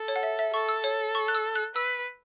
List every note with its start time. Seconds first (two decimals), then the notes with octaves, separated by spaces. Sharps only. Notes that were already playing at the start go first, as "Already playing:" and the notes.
Already playing: A4
0.08 C#5
0.16 F#5
0.23 E5
0.39 E5
0.53 A4 C#6
0.69 E6
0.84 C#5
1.15 C#6
1.28 F#6
1.35 E6
1.55 F#6
1.75 B4 E6